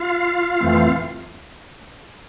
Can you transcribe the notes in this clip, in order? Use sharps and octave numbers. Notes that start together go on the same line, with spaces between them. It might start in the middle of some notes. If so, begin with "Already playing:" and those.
Already playing: F4 F5
F2 E3 A3 C4